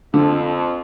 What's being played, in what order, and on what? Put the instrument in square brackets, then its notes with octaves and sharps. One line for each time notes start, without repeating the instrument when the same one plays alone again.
[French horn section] F2 F3 [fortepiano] D3